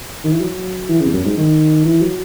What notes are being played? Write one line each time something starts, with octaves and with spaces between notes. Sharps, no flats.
D#3
E3
F#3
E3
C#3
E2
F#2
G#2
D#3
E3
F#3